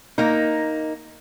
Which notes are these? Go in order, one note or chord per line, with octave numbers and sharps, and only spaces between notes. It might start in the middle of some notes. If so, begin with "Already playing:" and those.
A#3 D#4